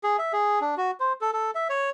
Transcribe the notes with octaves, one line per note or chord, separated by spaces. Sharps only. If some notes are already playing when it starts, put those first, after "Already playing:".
G#4
E5
G#4
D4
F#4
C5
A4
A4
E5
C#5